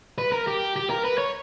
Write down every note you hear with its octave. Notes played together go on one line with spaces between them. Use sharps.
B4
A#4
G4
G4
A#4
B4
C#5